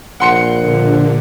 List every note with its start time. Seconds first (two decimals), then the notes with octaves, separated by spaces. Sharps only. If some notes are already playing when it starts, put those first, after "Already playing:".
0.20 A#1 F#5 C6 C#7
0.59 A#2 D3